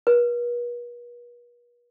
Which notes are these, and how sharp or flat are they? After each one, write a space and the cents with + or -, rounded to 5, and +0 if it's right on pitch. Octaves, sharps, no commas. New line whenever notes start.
B4 -45